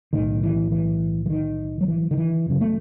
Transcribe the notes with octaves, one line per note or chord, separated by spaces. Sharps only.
B1 A2 D#3
E3
E3
E3
D#3
F#3
E3
D#3
E3
F#1 F#2 C#3
A3